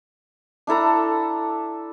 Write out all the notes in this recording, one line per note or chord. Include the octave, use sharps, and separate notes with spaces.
D4 E4 A4 A#5